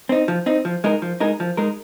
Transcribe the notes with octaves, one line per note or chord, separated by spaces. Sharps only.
C4 D#4
F3
C4 D#4
F3
G#3 D#4 A#4
F3
G#3 D#4 A#4
F3
G#3 D#4 A#4